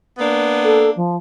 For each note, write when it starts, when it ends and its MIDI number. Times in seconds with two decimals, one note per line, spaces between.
0.19 0.94 58
0.19 0.94 59
0.19 0.94 62
0.64 0.90 69
0.96 1.16 53